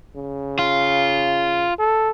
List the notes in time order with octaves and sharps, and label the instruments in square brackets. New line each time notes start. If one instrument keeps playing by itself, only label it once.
[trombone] C#3
[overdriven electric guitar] F4
[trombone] A4